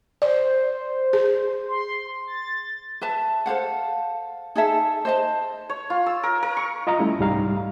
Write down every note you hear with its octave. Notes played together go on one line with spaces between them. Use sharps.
C5 D5
G#4
C6
A6
B4 E5 A5
A4 C5 F5 F#5
D#4 G#4 A4 E5
C5 D#5 A5
C#5
F4
E6
A#4
A#4
C#6
F4 D#5 F5 A#5
G3 A3 C#4 E4
C2 G#2 G3 D#4 F5 A#5